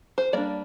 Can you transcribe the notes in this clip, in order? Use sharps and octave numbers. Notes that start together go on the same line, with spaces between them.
C5
G3 A#3 D4 D5